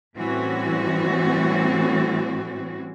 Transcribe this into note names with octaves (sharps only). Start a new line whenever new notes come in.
A2 E3 G3 C4 C#4 F#4